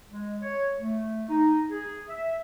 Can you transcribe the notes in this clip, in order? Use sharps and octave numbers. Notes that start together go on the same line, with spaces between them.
G#3
C#5
A3
D#4
G#4
E5